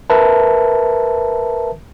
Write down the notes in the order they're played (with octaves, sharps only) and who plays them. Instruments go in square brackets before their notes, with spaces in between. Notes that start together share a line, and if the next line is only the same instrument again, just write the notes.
[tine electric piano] A#4 B4 E5 A5